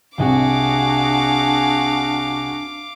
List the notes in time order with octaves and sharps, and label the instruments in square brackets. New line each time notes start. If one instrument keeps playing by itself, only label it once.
[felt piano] C2 C3 [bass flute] D4 [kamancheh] F#4 G#4 [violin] F5 D6